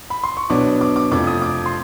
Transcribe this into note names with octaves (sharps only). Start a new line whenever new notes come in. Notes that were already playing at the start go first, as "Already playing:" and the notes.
B5
C6
C#6
B2 F#3 B3 D4 D6
D6
D6
F2 C3 F3 A3 D6
D#6
D6
C6